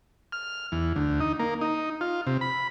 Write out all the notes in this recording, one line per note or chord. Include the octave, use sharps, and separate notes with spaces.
F6
E2
D2
D#4
A#3
D#4
F4
C3
B5